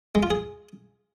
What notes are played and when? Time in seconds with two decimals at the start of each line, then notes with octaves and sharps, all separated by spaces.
0.15 G#3
0.23 F4
0.30 G#4